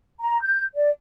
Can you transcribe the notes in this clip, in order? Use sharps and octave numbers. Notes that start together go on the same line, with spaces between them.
A#5
G6
D5